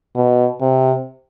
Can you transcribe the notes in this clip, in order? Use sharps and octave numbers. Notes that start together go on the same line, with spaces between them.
B2
C3